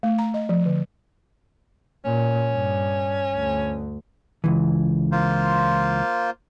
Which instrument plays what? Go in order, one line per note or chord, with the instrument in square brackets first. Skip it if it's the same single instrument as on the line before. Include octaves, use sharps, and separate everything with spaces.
[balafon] A3
A#5
D#5
F3
D3
[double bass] A#2 [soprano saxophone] C#4
[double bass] G2
D2
[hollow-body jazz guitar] C#2 E3
[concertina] A#3 F4 C5